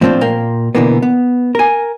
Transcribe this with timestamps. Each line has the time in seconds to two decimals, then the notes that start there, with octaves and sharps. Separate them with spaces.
0.01 A2 F3 A3 C4 D4 F4
0.21 A#2 A#4 F5 G5
0.75 B2 D3 E3 A#3 B3
1.02 B3
1.55 A#4 G#5